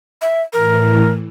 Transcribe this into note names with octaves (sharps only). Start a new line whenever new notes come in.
E5
A2 E3 A#4